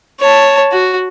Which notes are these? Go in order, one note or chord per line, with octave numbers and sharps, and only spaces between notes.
C#5 A5
F#4